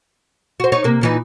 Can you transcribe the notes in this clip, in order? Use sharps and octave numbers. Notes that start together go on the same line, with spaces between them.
F#4 C5
D#4 C#5
C3 A#3
A#2 E3 D#4